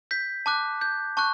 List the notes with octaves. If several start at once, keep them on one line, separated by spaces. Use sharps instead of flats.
G6 B6
A5 D6 F#6
G6
A5 C#6 F#6